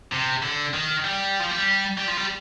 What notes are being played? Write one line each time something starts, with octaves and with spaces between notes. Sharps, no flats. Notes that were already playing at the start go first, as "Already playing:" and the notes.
C3
D3
D#3
G3
F3
G3
G3
F3
G3